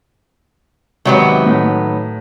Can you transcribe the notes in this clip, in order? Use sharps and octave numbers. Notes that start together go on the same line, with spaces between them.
G#2 C3 D#3 F#3 B3
A2